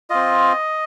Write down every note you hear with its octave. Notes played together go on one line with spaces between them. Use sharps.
C4 F4 D#5